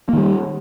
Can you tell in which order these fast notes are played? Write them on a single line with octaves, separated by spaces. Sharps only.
A#3 D#3 G3